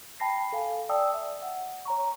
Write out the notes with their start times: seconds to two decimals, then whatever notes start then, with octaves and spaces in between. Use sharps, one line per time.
0.20 G5 A5 B5 A#6 C7
0.53 A4 F5 G#5
0.89 D5 G5 A5 D#6 E6
1.14 E5
1.42 F#5
1.85 C#5 A#5 C#6